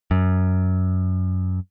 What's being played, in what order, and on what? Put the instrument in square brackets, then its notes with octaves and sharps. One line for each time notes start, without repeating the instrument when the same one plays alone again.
[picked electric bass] F#2